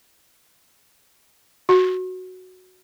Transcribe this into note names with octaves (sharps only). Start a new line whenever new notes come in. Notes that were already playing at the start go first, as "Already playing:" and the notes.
F#4